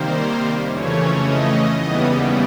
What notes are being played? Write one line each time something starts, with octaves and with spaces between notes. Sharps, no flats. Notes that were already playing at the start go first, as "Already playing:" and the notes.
Already playing: C3 D#3 G3 A#3 C5
F2 C#3 E3 A3 C#4 C#5
D#5
D#2 C#3 E3 G3 B3